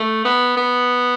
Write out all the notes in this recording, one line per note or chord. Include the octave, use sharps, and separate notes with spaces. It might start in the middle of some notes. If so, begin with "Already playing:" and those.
Already playing: A3
B3
B3